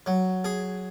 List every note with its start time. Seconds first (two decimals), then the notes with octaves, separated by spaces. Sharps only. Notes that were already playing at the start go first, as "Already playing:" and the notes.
0.06 F#3
0.44 G#4